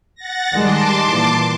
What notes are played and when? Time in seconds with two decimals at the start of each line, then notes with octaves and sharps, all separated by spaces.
0.15 F#5 A6 A#6
0.53 D#3 G3 G#3 A5 C6 D6
1.06 A#2 E3